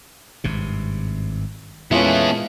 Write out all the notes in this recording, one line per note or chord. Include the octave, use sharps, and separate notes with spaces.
G#1 G2 C3
A#2 E3 G#3 A3 B3 C#4 E4 F4